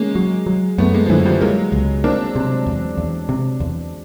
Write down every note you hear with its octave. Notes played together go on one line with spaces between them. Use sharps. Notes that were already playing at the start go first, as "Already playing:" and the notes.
Already playing: G#3 A#3 C#4
F#3
F#3
F#2 A3 B3
G#3 A#3
F3
F#2 D3 E3
F3 G3
F#3 G#3 A#3
C#2
A#3 C4 D4
C3
E2
E2
C3
E2